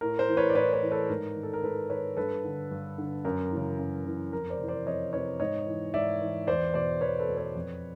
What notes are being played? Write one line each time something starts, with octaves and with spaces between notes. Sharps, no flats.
A2 A#4
A#4 C5
E3
B4 C#5
D5
A2 B4 C#5
B4 C#5
E3
A4 B4
G#2 A#4
D#3
A4
A#4
G#2 A4 B4
D#3 B4 C#5
G2 A4 B4
D3
G2
D3
F#2 A#4
E3
C#3
F#2
C#3 E3
F2 A#4
C5 D5
C3 E3
C5 D5
F2 C#5 D#5
C3 E3 B4 C#5
G#2 C#5 D#5
E3
G#2 D5 E5
E3
E2 C5 D5
B2 C5 D5
E2 B4 C#5
A4 B4
B2
B4 C#5
F2